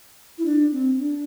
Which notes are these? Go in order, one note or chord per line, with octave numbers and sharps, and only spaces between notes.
E4
D4
C4
D4